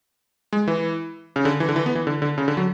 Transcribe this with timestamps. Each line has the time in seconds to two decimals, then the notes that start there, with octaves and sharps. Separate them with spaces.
0.53 G#3
0.68 E3
1.36 C#3
1.45 D3
1.60 E3
1.69 D3
1.76 E3
1.86 B3
1.95 E3
2.07 D3
2.22 D3
2.38 C#3
2.48 D3
2.57 F#3